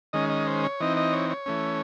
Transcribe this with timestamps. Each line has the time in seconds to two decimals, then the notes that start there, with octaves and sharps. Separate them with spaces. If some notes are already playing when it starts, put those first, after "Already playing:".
0.13 D#3 G#3 C#4 D#5
0.29 D#5
0.47 C5
0.64 C#5
0.80 E3 C4 D#4 D#5
0.97 D#5
1.13 C#5
1.30 C#5
1.46 E3 A3 C#4